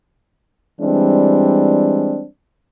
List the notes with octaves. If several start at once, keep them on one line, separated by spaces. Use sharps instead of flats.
E3 G3 G#3 C4 D4